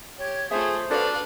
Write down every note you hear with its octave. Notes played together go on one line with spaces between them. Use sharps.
G4 C#5
A3 F4 G#4 C5 E5
D4 F#4 A4 B4 D5 F5